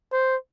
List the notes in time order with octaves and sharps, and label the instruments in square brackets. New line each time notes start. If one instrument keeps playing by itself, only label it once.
[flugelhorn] C5